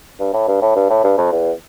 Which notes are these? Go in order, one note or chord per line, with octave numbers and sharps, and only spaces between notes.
G2
A2
G2
A2
G2
A2
G2
F2
E2